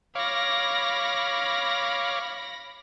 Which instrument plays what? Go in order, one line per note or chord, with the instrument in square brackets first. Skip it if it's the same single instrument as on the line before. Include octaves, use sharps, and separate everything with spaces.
[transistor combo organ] C#5 F5 D6 [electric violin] B5 A#6